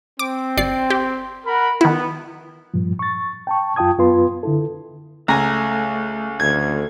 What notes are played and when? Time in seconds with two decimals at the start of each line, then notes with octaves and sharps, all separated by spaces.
0.19 C4 D6
0.57 G1 D5 C7
0.90 G4
1.46 A#4 F#5 B5
1.81 D#3 B3 E4
2.74 G2 A#2 F3
2.99 C#6 A6
3.47 G5 A5 C#6
3.76 F#2 F4 G5 A5 D#6 G#6
3.98 F#2 B3 F4 B4 C6
4.43 D3 E4 A4
5.28 C#2 A3 G#5 A#5
6.40 D2 G#6